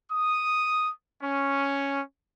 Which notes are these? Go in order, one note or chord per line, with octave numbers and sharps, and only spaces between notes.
D#6
C#4